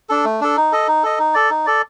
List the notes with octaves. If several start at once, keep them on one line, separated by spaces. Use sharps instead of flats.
D4 A4
A3
D4 A4
D#4
A4 D#5
D#4
A4 D#5
D#4
A4 D5
D#4
A4 D5